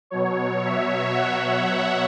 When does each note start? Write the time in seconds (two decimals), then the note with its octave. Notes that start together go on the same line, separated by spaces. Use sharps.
0.11 B2 F#3 C#5
0.63 E5
1.14 F#5